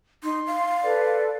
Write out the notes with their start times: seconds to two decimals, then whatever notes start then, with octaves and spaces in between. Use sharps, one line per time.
0.23 D#4 C6
0.47 F5
0.84 A4 B4 D5